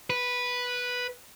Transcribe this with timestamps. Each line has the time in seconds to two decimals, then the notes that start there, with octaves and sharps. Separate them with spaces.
0.10 B4